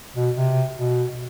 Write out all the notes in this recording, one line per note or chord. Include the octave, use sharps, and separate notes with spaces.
B2
C3
B2